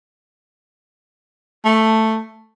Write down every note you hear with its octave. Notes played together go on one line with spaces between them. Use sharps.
A3